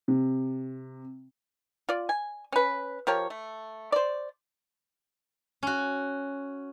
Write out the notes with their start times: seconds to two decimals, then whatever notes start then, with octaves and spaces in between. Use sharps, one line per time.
0.08 C3
1.89 F4 D5
2.09 G#5
2.52 C#4 B4
3.07 F3 G4 A#4 C#5
3.30 A3
3.92 C5 D5
5.63 C#4 F#4